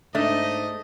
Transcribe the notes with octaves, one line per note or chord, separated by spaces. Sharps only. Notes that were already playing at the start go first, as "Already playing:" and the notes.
G#2 A3 D4 D#4 D#5